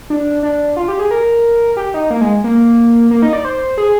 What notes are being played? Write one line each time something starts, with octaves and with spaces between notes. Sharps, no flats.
D4
D4
F4
G4
G#4
A#4
G4
D#4
A#3
G#3
A#3
A#3
D#4
D5
C5
G#4